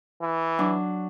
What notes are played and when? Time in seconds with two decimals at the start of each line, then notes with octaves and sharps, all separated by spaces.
0.22 E3
0.59 F#3 D4